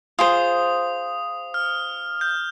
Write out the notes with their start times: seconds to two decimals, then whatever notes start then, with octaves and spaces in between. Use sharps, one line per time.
0.19 F4 G#4 C5 D#6
1.54 F6
2.21 G6